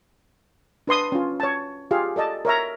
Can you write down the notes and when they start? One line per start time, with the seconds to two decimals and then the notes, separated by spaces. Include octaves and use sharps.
0.87 D4 B4 C6 D#6
1.12 C#4 F4
1.40 C#5 A5
1.91 F4 G4 G#4 F5
2.16 A4 D5 D#5 A5
2.45 A#4 C#5 E5 A#5